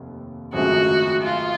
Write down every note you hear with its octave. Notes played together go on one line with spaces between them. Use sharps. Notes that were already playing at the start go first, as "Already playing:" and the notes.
Already playing: F1 D#2
G#1 F#2 C#3 F3 A3 F#4
F4